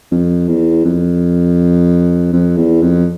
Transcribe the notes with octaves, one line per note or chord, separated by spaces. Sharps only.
F2
E2
F2
F2
E2
F2